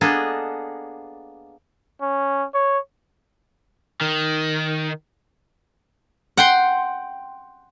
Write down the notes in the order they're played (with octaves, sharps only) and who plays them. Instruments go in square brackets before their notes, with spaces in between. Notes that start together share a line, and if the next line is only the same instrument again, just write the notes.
[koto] A#3 B3 D4 G#4 A4 D#5
[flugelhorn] C#4
C#5
[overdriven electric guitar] D#3
[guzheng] F#5 G5 C6